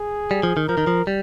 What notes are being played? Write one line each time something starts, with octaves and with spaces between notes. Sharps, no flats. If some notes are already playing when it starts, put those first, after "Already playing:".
Already playing: G#4
G3
F3
D#3
F3 A#4
D#3
F3
G3